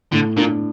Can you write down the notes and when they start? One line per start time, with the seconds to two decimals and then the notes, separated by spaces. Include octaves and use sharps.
0.12 A2 D3
0.37 A#2 D4